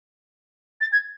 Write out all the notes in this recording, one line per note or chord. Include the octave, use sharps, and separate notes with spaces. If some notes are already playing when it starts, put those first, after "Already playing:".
A6
G#6